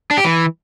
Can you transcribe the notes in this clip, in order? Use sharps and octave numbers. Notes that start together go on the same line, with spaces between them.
D4
G4
E3